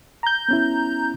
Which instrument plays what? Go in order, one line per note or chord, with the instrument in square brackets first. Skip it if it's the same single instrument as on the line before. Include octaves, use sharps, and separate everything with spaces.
[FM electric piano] A#5 G6
[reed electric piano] B3 C#4 E4